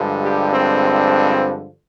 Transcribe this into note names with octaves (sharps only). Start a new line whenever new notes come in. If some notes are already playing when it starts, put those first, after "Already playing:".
Already playing: G2 D3 F3 G#3
G4
C4